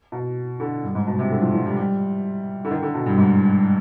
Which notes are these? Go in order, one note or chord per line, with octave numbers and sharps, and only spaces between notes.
B2
D3
G2
G#2
B2
C3
D3
F3
F3
G3
G3
D3
D#3
D3
B2
G2
G#2